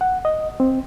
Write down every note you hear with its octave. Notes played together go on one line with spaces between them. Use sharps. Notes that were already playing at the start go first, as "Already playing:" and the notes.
F#5
D#5
C4